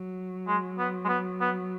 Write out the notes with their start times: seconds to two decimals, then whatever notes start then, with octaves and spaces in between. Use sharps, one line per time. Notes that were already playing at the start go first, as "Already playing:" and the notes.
Already playing: F#3
0.47 G#3
0.78 B3
1.04 G#3
1.08 B3
1.40 B3